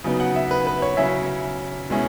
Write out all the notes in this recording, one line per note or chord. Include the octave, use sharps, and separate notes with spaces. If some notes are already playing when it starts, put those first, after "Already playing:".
C#3 F#3 B3 D#4
F#5
E5
B4
B4
C#5
C#3 F#3 C#4 E4 E5
B2 G#3 C#4 E4